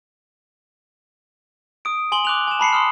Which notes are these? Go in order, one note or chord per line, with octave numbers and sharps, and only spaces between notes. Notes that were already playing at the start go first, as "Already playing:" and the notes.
D#6 D7
G#5 C6 F#7 G7
D6 F#6 F7
G#5 E7
A5 B5 C7 C#7
C6 D#6 F6